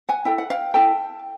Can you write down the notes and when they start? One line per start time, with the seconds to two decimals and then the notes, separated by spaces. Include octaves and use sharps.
0.09 F#5 G#5
0.25 E4 A4 G5
0.38 F#5
0.50 F5 G5
0.74 E4 A4 G5 A5